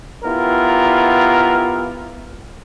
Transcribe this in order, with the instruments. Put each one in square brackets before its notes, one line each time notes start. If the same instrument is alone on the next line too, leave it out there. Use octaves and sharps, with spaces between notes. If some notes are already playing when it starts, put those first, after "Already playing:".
[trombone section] B3 E4 F4 G4 A#4